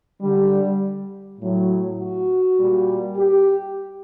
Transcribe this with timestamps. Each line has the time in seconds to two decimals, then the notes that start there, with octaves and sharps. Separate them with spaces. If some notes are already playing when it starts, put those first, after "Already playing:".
0.21 D3 G3
1.39 A2 F#3
1.99 F#4
2.58 A#2 G3
3.17 G4